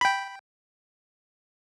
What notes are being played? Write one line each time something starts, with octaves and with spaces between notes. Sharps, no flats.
G5 B5